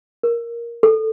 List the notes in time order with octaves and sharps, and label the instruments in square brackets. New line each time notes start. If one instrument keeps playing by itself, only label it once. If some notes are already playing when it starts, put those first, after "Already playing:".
[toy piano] A#4
A4